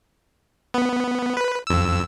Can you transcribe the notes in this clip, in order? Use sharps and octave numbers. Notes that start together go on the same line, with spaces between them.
B3
B4
F2 E6